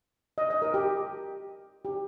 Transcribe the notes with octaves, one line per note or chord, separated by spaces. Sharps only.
D#5
D#5
A#4
G4
G4